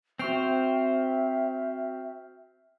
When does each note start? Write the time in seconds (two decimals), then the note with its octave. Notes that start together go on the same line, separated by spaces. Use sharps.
0.19 C4 F#4 C5 E5 G5 C#6 F6 C7